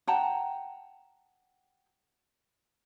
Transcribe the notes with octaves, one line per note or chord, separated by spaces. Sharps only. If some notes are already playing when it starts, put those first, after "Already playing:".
F#5 G5 A5 A#5